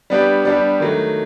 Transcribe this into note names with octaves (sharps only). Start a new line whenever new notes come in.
G3 B3 D4 G4
G3 B3 D4 G4
D#3 F#3 A3